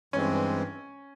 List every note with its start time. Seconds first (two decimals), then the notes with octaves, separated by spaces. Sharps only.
0.13 G2 E3 G#3 C4 C#4